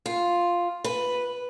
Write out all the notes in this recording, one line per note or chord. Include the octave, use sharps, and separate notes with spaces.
F4
B4